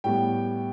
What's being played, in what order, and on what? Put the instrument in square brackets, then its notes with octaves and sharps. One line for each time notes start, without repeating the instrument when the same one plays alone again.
[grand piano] A2 G3 B3 G5